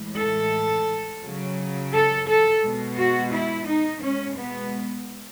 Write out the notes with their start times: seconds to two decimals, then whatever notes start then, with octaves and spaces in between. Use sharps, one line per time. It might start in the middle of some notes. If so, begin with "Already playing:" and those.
Already playing: A2 E3 G#3
0.19 A4
1.23 C#3 F#3
1.93 A4
2.28 A4
2.63 B2 G#3
2.97 F#4
3.32 E4
3.67 D#4
4.02 B2 G#3 C#4
4.37 B3